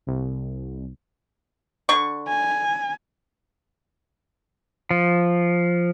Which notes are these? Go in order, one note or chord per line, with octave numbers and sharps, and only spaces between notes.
C2
D3 C#6
G#5
F3